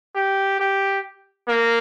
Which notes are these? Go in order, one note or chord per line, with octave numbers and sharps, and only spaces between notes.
G4
G4
A#3